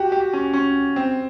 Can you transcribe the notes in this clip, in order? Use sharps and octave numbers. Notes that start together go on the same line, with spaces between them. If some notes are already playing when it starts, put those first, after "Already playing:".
Already playing: F#4 G4
G4
C#4
C#4
C4